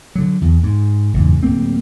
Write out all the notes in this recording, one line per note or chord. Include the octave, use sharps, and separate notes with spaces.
D3 F#3
E2
G#2
F#1 E2 G#2
D1 A#3 C4